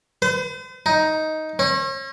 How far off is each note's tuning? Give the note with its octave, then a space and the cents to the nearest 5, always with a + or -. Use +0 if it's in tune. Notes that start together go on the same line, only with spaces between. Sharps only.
C5 -45
D#4 +10
C#4 -40